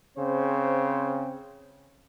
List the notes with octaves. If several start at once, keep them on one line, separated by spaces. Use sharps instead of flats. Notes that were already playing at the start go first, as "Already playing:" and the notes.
C#3 C4 C5